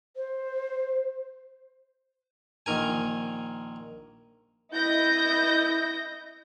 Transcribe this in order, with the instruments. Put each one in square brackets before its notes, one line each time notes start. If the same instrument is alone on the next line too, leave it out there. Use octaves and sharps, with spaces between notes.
[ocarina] C5
[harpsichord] A#1 D#3 A#4 G#5
[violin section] E4 D#5 G6 A#6